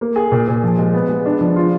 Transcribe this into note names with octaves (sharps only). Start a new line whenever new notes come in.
A#3
G#4
A#2
A#2
F3
G#3
B3
G#3
D4
F3
F4